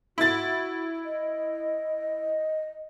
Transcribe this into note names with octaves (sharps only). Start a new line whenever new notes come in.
E4 F#4 A6
D#5